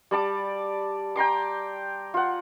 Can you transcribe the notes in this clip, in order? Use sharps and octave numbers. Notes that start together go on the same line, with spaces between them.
G3 D5 A5 D6
G5 A#5 C6 D6
F4 F#5